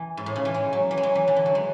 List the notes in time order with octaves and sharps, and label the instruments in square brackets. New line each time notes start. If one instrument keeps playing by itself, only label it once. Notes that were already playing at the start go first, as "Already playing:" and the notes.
Already playing: [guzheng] E3
G#2
A2
C#3
E3
G#3
F#3
E3
G#3
F#3
E3
D3
E3
F#3
G#3